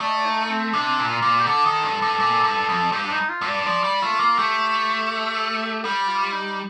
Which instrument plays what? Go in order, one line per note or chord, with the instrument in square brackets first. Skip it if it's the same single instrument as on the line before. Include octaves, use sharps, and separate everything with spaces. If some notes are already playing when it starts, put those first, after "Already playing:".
[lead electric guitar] A3 [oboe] D5
[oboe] D#5
D5
D#4
C4
[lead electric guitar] C3 [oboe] D4
[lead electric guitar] A#2
[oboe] F4
[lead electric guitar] A#2
[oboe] G4
[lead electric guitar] D3 [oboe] A4
[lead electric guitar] D#3
G2
G2
A#2
G2
F2
[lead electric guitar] G2 [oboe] G4
[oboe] D4
D#4
F4
[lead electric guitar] G2
[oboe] D5
[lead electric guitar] F3 [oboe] D5
[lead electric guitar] G3
[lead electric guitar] A3 [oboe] F4
[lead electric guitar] A#3
[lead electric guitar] A3 [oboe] G4
[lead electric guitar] G3 [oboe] G4
[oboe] F4
D#4